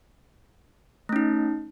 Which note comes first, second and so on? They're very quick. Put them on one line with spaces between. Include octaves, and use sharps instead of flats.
A3 C#4 D#4